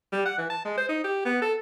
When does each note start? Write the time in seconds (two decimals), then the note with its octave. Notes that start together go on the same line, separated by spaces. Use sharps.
0.12 G3
0.25 F#5
0.38 E3
0.50 A5
0.65 G#3
0.77 C5
0.89 D#4
1.04 G4
1.25 B3
1.42 A4